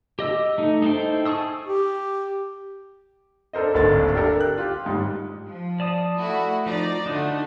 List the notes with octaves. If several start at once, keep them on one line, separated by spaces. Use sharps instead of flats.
G4 D#5 E6
A3 D#4
D#4 E4 A4 C5 G5
G#4 A5 C#6 D#6 E6
G4
D4 A4 A#4 C5 D#5
D1 G#1 D#2 D3 A6
D4 G4 A4 A#4
F#6
F4 G4
G#2 G3
F3
D5 A5 D#6
A3 E4 F#4
F3 D#4 D5 A#5
D3 A3 D4 D#4 F#4